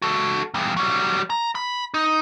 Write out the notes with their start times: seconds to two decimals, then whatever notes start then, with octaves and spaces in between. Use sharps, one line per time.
0.02 F#4 A4
0.54 E2 G3
0.77 F#3 G3
1.30 A#5
1.55 B5
1.94 D#4